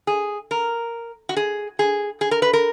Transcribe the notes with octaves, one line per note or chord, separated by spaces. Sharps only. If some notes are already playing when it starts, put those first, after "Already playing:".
G#4
A#4
F#4
G#4
G#4
G#4
A#4
B4
A#4